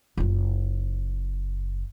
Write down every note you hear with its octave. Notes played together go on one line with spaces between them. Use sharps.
F#1 F4